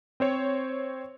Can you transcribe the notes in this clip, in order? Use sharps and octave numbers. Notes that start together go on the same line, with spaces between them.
C4 C5 C#5